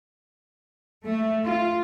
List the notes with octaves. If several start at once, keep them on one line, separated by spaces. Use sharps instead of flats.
A3
F4